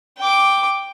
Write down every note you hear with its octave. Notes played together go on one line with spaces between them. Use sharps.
G5 D6